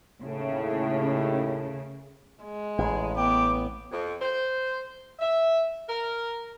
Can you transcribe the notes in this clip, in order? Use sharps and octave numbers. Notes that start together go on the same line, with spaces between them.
D#2 A2 C#3 A3
G#3
A1 G#4
B3 G5 D6
F2
C5
E5
A#4